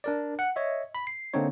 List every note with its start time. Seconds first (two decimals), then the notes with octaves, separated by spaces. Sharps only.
0.04 D4 A#4 D5
0.39 F#5
0.56 C#5 D#5 E5
0.95 B5
1.07 C7
1.34 D3 A#3 C4 D4 D#4 C#5